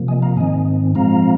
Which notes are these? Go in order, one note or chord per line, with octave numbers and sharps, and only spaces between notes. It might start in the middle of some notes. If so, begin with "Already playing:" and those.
Already playing: C3 F3 A#3
D#5 G#5
F5 A#5
G#2 D#3 C4 D#5 G#5
A#2 F3 G#3 C4 F5 A#5